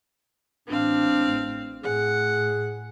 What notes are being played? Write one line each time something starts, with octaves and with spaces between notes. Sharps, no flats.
A1 C4 D4 F5
A2 G#4 F#5